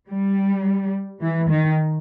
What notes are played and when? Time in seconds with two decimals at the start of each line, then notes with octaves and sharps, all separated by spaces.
0.08 G3
1.21 E3
1.49 D#3